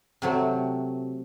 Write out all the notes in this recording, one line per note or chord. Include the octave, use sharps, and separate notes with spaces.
C3 F#3 A3